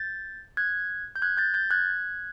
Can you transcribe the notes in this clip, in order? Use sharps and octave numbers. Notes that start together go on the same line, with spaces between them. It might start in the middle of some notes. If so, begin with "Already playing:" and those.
Already playing: G6 A6
F#6 G#6
G6
F#6 G#6
G6 A6
G6 A6
F#6 G#6